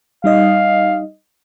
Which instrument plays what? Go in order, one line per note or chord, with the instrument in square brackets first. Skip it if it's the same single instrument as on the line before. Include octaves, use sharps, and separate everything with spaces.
[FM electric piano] G3 D#4 D#5 [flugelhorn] F5